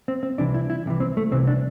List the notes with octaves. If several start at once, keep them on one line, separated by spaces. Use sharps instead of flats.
C4
C4
C2 C3 E3 D4
E4
E4
C2 C3 E3
C4
A3
C2 C3 E3 C4
D4